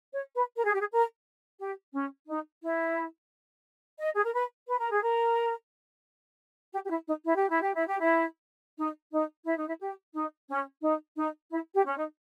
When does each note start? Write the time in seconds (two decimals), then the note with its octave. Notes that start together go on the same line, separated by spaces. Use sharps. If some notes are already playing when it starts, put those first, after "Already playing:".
0.12 C#5
0.35 B4
0.57 A#4
0.65 G#4
0.73 G4
0.80 G#4
0.92 A#4
1.60 G4
1.94 C#4
2.28 D#4
2.62 E4
4.00 D#5
4.15 G#4
4.24 A#4
4.33 B4
4.68 B4
4.78 A#4
4.91 G#4
5.02 A#4
6.72 G4
6.84 G4
6.89 E4
7.07 D#4
7.24 E4
7.36 G4
7.49 E4
7.61 G4
7.74 E4
7.87 G4
7.99 E4
8.77 D#4
9.12 D#4
9.46 E4
9.56 D#4
9.67 E4
9.80 G4
10.14 D#4
10.48 C#4
10.82 D#4
11.16 D#4
11.51 E4
11.74 G4
11.86 C#4
11.96 D#4